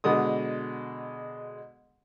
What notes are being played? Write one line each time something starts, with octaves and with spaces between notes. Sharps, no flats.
B2 D3 G#3 D#6